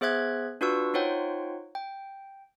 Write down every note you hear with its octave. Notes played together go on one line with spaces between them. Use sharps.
B3 G#4 C5 E5 F#6 G#6
D4 F4 F#4 B4 C#6 E6
D#4 F4 C5 C#5 F#5 G5
G5